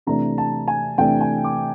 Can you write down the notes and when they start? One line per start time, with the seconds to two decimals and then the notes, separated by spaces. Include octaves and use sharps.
0.07 C3 E3 A3 D4 A#5
0.38 A5
0.68 G#5
0.98 C3 E3 A3 D4 G5
1.21 G#5
1.44 D6